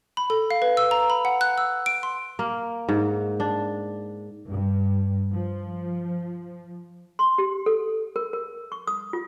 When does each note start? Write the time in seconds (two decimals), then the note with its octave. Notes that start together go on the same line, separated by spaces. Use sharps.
0.17 B5
0.30 A4
0.51 F5
0.62 B4
0.77 E6
0.91 A#5
1.10 B5
1.25 F#5
1.41 F#6
1.58 E6
1.86 D7
2.03 C6
2.39 A#3
2.89 G#2
3.40 D4
4.47 G2
5.32 F3
7.19 C6
7.38 G4
7.66 A4
8.16 A#4
8.33 A#4
8.72 C#6
8.87 D#6
9.13 F4